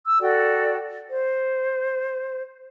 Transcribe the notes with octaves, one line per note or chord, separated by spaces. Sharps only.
E6
F#4 A4 D5 G5
C5